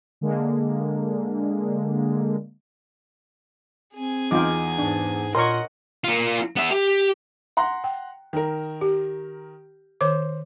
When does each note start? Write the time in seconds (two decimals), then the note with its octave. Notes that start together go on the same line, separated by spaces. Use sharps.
0.21 D3 G#3 A#3
3.95 C4 G#4 G#5
4.31 E2 D#4 F4 G5 D6
4.79 G#2 D4
5.35 A#2 A#4 C#5 D#5 F#5 C6 C#6
6.04 A#3 F4
6.56 B3 E5
6.71 G4
7.57 F#5 A#5 C6
7.84 G5
8.33 D#3 A#4
8.81 G4
10.01 D#3 C5 C#5 D6